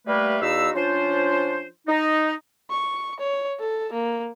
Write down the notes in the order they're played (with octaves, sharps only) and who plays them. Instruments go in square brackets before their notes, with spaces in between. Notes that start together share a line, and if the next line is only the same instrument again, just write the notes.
[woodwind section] G3 A3 A#3 B4
E2 D#4 F#4 F5 B5 E6
F3 C#4 D4 F4 C5
D#4
[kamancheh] C#6
C#5
A4
A#3